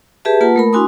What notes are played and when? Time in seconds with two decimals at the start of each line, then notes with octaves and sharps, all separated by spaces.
0.25 G4 G#4 B4 E5 A5
0.41 A#3 F4 B4 F#5 A5
0.56 A3 A#4 B5
0.73 D4 E4 F#4 G#5 C6 D#6